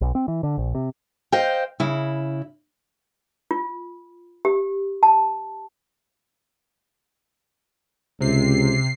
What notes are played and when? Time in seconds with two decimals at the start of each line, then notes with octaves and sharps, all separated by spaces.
0.01 B1
0.15 C4
0.28 E3
0.43 D3
0.58 A#1
0.75 C3
1.32 C5 D#5 F5 G5
1.80 C#3 E4
3.51 F4
4.45 G4
5.03 A5
8.20 C#2 C3 C7